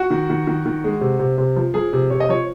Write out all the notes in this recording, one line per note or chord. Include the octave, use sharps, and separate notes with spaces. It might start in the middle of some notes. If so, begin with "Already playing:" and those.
Already playing: F#4
D#3
D#3
D#3
D#3
G#3
C3
C3
C3
F3
F3 G#4
C3
C3 C#5
D#5
F3 C#5